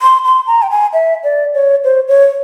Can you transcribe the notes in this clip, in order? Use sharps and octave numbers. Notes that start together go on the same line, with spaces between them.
C6
C6
A#5
G5
G#5
E5
D5
C#5
C5
C#5